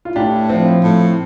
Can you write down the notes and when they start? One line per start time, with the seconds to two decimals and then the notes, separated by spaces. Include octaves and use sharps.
0.05 F4
0.16 A2 D4 G4
0.49 F3 C4
0.84 A2